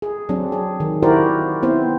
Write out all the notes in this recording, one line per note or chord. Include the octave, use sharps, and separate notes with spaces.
G#4
F#3 C4 D4
G#4
D#3
E4 F#4 G4 A#4 C5 D5
B3 C4 E4 C5